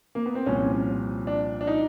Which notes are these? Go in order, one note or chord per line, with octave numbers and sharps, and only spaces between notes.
A#3
B3
C4
C2 A#2 F3 C#4
D4
D4
D#4